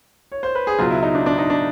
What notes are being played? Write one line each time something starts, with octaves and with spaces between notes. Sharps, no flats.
C#5
C5
B4
G#4
C#2 B2 F#3 F4
E4
D#4
D4
D4
D#4
D4